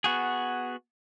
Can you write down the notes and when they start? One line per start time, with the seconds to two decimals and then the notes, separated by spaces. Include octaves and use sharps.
0.04 B3 F#4 G#4